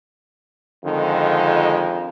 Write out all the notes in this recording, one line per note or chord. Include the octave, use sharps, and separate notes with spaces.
F2 D3 D#3 G#3